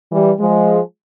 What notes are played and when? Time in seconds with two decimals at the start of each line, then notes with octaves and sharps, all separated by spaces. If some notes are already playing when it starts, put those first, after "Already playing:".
0.12 E3 G3
0.40 F3 G#3